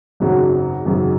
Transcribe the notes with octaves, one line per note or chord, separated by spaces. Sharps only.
G#1 F#2 C#3 F#3
G#1 F#2 C#3 F#3